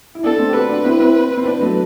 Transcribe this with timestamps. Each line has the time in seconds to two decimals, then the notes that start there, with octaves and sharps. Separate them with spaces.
0.15 E4
0.23 B3 D4 A4
0.38 A3 C4
0.49 G4
0.54 D4 F#4 B4
0.69 D4 F#4
0.85 C4 E4
1.00 C4 E4
1.37 C4
1.45 B3 D4 B4
1.60 F#3 A3